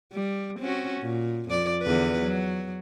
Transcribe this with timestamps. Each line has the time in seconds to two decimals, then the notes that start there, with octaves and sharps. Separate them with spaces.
0.13 G3
0.60 C4 C#4 F#4
1.02 A#2
1.49 F2 D5
1.82 E2 D3 B4
2.21 F#3